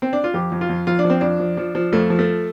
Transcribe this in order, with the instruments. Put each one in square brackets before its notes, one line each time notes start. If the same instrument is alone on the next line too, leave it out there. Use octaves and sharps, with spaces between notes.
[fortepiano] C4
D4
F4
F2 G4
F2
F4
F2
F2 F4
D4
F3
C4
F2 D4
F3
F3
F3
F2 A3
F3
A3